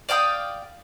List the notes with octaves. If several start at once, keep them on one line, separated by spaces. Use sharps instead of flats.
D5 F5 G5 D#6